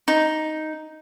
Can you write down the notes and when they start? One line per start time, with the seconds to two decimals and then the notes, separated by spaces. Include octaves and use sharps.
0.08 D#4